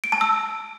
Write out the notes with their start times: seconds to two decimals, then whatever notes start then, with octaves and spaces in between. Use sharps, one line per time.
0.04 D7
0.12 A5
0.21 E6